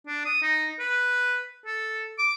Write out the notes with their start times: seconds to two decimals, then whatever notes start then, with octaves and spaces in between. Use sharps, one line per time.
0.07 D4
0.25 D#6
0.42 D#4
0.80 B4
1.66 A4
2.18 D6